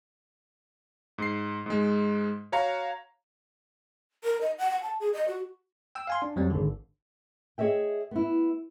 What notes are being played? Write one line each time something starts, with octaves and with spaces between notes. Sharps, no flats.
G#2 C7
G#2 G#3
F#4 C#5 F5 A#5
A#4
D#5
F#5
F#5
A5
G#4
D#5
F#4
G5 E6
F5 G#5 C6
D4
F2 F#3 G3 C4
G#1 D3
G#4 C#5 D#5 E5 G5
B3 E4